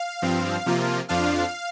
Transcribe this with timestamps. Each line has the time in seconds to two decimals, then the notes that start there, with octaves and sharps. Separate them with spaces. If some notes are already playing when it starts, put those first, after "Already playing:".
Already playing: F5
0.22 G2 F3 C4
0.66 C3 F3 A#3 F4
1.09 F2 F3 D4 F4 F5